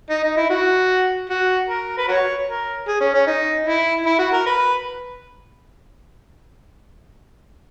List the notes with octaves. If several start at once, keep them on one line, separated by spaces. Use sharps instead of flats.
D#4
D#4
E4
F#4
F#4
A#4
B4
F#4 A#4 C#5
A#4
G#4
C#4
C#4
D#4
E4
E4
F#4
A#4
B4